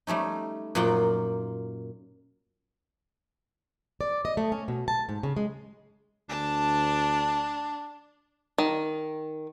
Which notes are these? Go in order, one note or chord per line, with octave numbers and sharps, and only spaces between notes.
G3 A3 C#4 D#4
F#2 A#2 A#3 F4 F#5 G5
D5
D#5
A3
C#4
B2
A5
G#2
C#3
G#3
D2 D4 A5
D#3